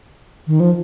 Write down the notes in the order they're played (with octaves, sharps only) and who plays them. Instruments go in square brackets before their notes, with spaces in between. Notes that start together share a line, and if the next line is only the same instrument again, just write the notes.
[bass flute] D#3
F3